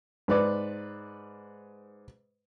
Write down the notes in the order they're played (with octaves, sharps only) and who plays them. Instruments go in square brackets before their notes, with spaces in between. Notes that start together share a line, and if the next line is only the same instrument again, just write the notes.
[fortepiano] G#2 B4 D5